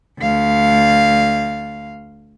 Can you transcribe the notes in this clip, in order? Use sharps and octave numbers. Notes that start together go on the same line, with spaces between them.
D2 F5